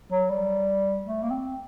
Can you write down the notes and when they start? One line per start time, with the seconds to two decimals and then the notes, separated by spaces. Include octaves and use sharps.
0.11 F#3
0.30 G3
1.06 A3
1.23 A#3
1.30 C4